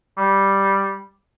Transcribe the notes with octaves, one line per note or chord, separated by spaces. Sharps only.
G3